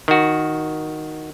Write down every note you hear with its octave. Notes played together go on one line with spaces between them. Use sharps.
D#3 F#4